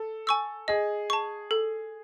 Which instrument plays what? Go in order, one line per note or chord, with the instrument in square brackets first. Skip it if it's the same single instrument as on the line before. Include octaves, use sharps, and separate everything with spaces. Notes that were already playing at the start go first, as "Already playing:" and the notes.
Already playing: [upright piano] A4
[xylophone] G#5 C#6 E6
[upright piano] G#4 [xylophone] D#5
[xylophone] A5 C#6
A4